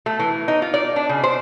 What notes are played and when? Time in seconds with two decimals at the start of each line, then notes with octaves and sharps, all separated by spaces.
0.06 A3
0.19 E3
0.48 D#4
0.62 F4
0.74 D5
0.96 D4
1.09 C#3
1.24 C5